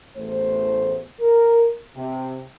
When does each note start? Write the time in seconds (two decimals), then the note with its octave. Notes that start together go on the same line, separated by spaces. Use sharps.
0.17 A1 E2 A3 C5
1.21 A#4
1.96 C3